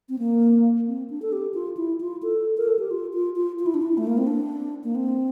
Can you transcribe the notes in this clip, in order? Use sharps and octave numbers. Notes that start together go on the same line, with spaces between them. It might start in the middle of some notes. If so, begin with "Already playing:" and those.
C4
A#3
C4
D4
A4
G4
F4
E4
F4
A4
A#4
A4
G4
F4
F4
F4
F4
E4
D4
E4
A3
A#3
C4
D4
A#3
C4